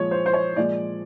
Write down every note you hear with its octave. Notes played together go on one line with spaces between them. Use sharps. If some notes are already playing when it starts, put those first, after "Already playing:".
Already playing: A#2 F3 G#3 C#5
C5
C5
C#5
A#2 F3 G#3 D5